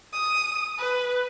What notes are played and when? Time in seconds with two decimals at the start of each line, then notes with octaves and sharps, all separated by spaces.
0.13 D#6
0.78 B4